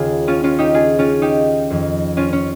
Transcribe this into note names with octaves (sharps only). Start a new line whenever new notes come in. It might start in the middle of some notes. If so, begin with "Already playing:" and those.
Already playing: D#2 C#3 F4 G#4
C#4 F4
C#4 F4
D#4 G4
F4 G#4
C#4 F4
D#4 G4
F2 D#3
C#4 F4
C#4